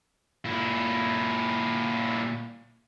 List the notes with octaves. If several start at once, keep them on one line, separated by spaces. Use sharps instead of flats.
A#2 E4